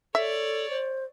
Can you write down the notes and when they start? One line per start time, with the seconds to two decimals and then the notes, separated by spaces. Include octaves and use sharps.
0.15 A4 C#5 D5 E5
0.70 C5